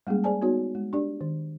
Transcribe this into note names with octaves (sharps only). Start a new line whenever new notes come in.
G3 G#3 A#3 C#4 G#4
G#4 C5 D5 G#5 A5
B3 D#4 F#4 C#5
G#3
D4 G4 D5
D#3